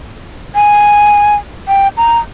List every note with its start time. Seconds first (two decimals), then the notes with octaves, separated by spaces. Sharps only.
0.55 G#5
1.68 G5
1.97 A#5